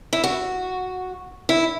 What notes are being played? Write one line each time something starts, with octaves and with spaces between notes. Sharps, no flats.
E4
F#4
E4